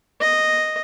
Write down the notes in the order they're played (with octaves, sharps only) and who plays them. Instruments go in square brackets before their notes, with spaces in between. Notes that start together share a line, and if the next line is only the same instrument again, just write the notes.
[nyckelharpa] D#5